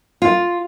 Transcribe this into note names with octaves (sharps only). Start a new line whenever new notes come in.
F4